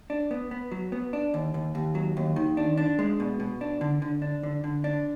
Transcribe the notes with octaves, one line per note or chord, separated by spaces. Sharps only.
D4
B3
B3
F#3
B3
D4
D#2
D#2
D#2
F#3
D#2
D#3
D4
D4
G#3
B2
B2
D4
D3
D3
D4
D3
D3
D4